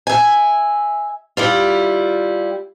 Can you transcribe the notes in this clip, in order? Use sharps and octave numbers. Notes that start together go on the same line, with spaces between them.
E5 G#5
G3 E4 F4